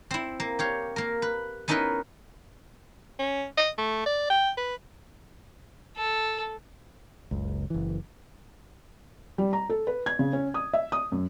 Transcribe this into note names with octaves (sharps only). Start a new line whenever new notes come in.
C4 E4
A#3
G4 C#5 F5
A#3 A#4
B4
B3 C#4 D#4 E4 A#4 B4
C#4
D#5
A3
D5
G5
B4
A4
F#1 C#2
F#1 E3
G3
A#5
A4
B4
G#6
C#3
C#4
D#6
E5
D#6
F#2